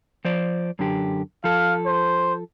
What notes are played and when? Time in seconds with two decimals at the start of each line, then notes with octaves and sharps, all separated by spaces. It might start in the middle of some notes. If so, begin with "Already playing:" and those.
0.25 F3 C5 D5
0.79 F#2 D3 G4
1.44 F3 A4 F5
1.86 C5